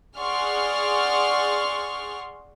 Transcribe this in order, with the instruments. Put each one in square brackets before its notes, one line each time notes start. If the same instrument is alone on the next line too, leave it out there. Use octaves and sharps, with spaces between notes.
[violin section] G#4 D5 F#5 C6 C#6 F6